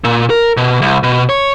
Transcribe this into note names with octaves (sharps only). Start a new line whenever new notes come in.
A#2
A#4
B2
C2
B2
C#5